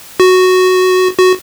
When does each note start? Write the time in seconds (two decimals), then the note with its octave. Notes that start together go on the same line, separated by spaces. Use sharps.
0.20 F#4
1.18 F#4